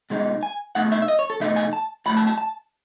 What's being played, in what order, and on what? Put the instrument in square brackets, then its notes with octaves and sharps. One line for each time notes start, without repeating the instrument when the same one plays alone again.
[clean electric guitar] B2 G#3 D#4
G#5
B2 A3 D#4 F#5
E5
E5
D#5
C#5
A4
E2 B2 A3 D#4 E5
G#5
A5
A2 F#3 A3 B5
A5
A5
A5